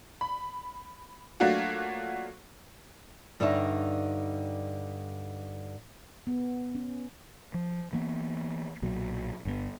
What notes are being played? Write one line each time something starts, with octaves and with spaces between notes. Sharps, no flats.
B5
F#3 A3 A#3 D4 F4 F#4
G2 D3 D#4 C#5 E5 A5
B3
C#4
F3
E3 A#3 B3
B1 A#2 F#3
G1 G2 C#3 B3